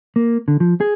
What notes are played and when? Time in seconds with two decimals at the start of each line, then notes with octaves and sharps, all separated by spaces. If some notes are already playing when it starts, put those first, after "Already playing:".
0.16 A#3
0.48 D3
0.60 F3
0.80 G#4